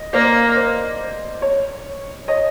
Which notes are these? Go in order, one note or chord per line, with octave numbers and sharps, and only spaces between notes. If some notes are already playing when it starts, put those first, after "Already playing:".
Already playing: D#5
A#3 C5 D5
C5
C#5
C#5 D#5